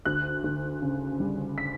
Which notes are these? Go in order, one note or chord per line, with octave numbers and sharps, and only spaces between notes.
D2 F#6
D2
C#3
G3
B6